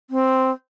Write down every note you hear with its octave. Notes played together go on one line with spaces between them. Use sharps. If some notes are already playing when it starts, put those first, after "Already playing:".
C4